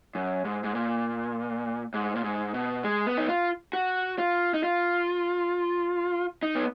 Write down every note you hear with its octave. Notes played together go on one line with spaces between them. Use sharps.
F#2
G#2
G#2
A#2
G#2
A#2
G#2
B2
G#3
B3
D#4
F4
F#4
F4
D#4
F4
D#4
B3